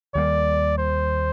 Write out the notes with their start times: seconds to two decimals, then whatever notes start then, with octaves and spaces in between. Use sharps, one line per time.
0.14 D#2 D#3 G3 A#3 D5
0.78 C5